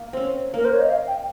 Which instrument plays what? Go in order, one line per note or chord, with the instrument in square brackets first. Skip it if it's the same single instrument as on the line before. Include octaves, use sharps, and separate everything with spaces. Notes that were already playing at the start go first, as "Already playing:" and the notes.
Already playing: [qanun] A#3
C4 C#4
[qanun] A#3 [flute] A#4
[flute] C5
C#5
D#5
F5
G5